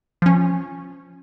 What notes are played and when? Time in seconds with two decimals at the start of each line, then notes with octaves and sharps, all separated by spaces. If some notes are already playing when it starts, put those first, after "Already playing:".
0.22 F3 C#4